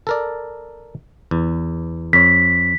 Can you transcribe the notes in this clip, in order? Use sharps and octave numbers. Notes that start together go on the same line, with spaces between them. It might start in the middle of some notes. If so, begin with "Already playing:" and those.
A4 A#4 D5
E2
F2 C#5 B6